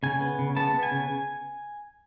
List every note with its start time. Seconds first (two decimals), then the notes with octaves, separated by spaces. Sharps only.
0.03 C#3 G#5
0.21 B3
0.39 C#3
0.57 B3 A5
0.74 B3
0.83 G#5
0.91 C#3